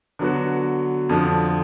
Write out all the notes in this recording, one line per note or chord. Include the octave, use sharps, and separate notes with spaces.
D3 F#3 B3 F#4
F2 D3 F3